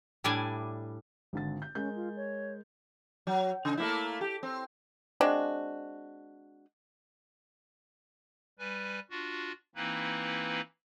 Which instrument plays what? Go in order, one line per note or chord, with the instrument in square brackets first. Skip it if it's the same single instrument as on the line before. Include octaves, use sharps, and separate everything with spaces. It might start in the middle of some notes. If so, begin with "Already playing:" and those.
[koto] A2 G3 D4 E4 D5 G#5
[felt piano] G#1 D3 A6
G6
[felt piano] G#3 A#4 G6 [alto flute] C#4
[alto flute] F4
C#5
[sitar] F#3
C#3
A3 A#3 E4
G4
C4
[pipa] G#3 C4 D4 F#4
[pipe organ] G3 B4 G#5
D4 F4 F#4
E3 A#3 C4 D#4 E4 B4